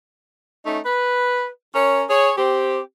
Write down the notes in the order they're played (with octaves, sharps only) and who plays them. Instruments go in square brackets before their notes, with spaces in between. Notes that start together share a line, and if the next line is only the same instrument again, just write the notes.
[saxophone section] A3 C#4 D#4
B4
C#4 A#4 C#5
G#4 C#5
C4 G4